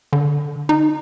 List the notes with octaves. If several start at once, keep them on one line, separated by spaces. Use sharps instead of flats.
D3
D#4